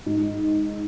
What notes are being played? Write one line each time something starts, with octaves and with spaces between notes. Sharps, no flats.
G#2